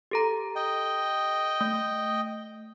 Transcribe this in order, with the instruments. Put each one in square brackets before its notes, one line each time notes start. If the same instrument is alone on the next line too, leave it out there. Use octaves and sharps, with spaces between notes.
[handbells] G4 A4 A#5
[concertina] D#5 G5
[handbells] A3